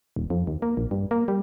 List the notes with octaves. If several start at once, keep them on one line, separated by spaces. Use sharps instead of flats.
D#1
F2
D#2
A#3
A#1
G2
A#3
G3